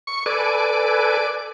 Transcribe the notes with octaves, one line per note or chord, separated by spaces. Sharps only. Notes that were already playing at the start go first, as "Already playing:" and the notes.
C#6
A4 B4 D5 G#5